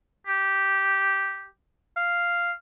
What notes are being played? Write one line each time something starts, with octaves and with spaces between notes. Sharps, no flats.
G4
F5